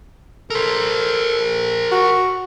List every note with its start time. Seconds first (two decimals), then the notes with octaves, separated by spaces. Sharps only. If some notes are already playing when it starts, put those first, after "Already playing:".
0.50 A4 A#4 C5
1.92 F#4